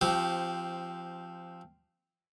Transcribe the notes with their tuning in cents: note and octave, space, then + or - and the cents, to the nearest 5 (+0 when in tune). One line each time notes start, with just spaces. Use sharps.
F3 -10 C4 +0 G4 -25